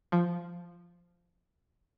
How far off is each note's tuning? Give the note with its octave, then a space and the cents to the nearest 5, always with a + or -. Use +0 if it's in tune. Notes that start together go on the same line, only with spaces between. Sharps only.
F3 -5